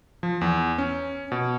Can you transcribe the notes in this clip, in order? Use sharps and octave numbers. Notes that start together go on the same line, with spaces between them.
F3
E2
C#4
B2